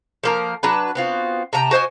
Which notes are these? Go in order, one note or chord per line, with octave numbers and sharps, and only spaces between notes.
F3 A#3 A#4
F#3 D4 B4
B3 C4 F4 F#4
C3 G5 A5 A#5
F#4 C5 D#5 G#5